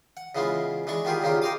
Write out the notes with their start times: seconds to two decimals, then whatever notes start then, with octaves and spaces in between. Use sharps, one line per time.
0.17 F#5
0.35 C#3 E3 G#3 B3 F4
0.87 E3 G#3 D4 C#6
1.05 D#3 B3 F4 G4 G#4
1.22 A#2 C#3 A#3 D#4 F4 G4
1.42 D#5 G5 A#5 C6 D6 D#6